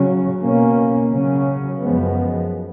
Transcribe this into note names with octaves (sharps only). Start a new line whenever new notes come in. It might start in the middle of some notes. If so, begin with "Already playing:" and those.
Already playing: C#3 F#3 C#4
B2 A#3 C#4
C#3 F#3 C#4
F#2 F3 G#3 B3